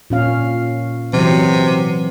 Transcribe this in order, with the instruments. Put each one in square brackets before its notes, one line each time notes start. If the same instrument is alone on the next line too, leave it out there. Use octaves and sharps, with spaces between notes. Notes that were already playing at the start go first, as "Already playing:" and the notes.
[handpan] A#2 C#4 F5
[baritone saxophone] C3 [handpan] E3 F#3